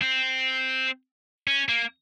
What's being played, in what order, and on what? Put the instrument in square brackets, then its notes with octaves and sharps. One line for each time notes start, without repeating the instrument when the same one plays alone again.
[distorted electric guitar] C4
C#4
A#3